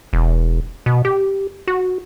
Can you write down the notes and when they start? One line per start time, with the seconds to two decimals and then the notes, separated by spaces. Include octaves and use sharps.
0.13 E1
0.86 B2
1.05 G4
1.67 F#4